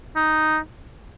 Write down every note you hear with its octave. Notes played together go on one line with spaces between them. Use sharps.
D#4